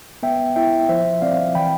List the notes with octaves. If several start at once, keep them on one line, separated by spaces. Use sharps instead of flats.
B3 E5 G5
E4 E5 G5
F3 C5 E5
C4 D5 F5
E3 G5 B5